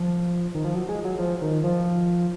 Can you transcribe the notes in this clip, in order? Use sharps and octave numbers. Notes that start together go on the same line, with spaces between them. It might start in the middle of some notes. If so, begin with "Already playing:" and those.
Already playing: F3
D#3
F3
F#3
G#3
F#3
F3
D#3
F3